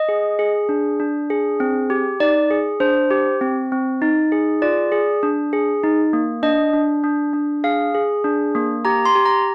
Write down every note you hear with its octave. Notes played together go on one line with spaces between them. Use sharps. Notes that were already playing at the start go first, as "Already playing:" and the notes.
Already playing: D#5
G#4
G#4
D4
D4
G#4
C4
G4
D#4 D5
G#4
D4 C5
G4
C4
C4
D#4
G#4
F4 D5
G#4
D4
G#4
D#4
A#3
D4 D#5
D4
D4
D4
G#4 F5
G#4
D4
A#3
G4 A#5
C6
G4
A#5